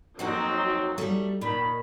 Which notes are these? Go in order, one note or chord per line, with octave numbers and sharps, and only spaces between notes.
F2 F#3 A#3 C4 D#4 F#5
G3 A3
A#2 D#3 B5